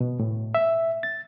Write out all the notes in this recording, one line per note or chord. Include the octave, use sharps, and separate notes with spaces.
B2
A2
E5
A6